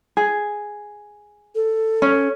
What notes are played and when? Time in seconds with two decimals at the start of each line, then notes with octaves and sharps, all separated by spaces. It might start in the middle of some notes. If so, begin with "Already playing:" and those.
0.17 G#4
1.55 A4
2.02 C#4